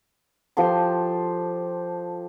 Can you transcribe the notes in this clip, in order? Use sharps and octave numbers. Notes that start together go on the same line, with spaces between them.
F3 G4 A4 C6